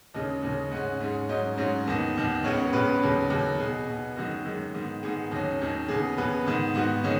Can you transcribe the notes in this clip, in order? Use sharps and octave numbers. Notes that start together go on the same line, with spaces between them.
D#2 C#3 G#3 C#4 D#5
D#2 C#3 G#3 C#4
G#2 G#3 C#4 F#5
G#2 G#3 C#4
G#2 F#3 C#4 D#5
G#2 F#3 C#4
D#2 D#3 B3
D#2 D#3 B3
C#2 C#3 B3 C#5
C#2 C#3 B3 B4
D#2 C#3 F#3
D#2 C#3 F#3
B2 B3 G#4
B2 B3
F#2 D#3 G#3 F#4
F#2 D#3 G#3
G#2 D#3 B3
G#2 D#3 B3 G#4
D#2 D#3 F#3 C#4
D#2 D#3 F#3 C#4
D#2 C#3 B3 G#4
D#2 C#3 B3 B4
G#2 D#3 B3
G#2 D#3 B3 F#4
D#3 G#3 C#4